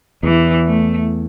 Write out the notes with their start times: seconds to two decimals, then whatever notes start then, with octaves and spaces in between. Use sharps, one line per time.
0.23 E2 E3
0.66 A3